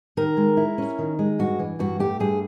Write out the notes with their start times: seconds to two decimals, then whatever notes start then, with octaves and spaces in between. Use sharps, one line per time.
0.17 D#3 A#4
0.37 G#3
0.57 E4
0.78 C#4
0.99 D#3
1.19 G#3
1.39 G2 F#4
1.59 E3
1.79 G2 F#4
1.99 A3 G4
2.20 G2 G#4